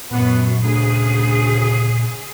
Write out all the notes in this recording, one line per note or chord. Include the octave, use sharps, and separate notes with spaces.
F#2 A#2 B3
D2 C#3 G#4